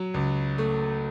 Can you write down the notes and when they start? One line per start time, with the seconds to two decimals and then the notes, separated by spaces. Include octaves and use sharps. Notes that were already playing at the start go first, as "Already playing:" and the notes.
Already playing: F#3
0.14 C#2
0.58 A3